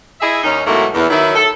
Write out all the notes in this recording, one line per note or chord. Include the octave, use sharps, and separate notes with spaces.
E4 G#4 D#5 E5
D#2 C#4 D#4
G#2 B2 E3 F#3 A3 A#3
E2
D#3 F#3 E4
A4